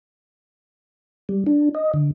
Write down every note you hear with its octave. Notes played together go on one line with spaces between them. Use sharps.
G3
D4
D#5
D3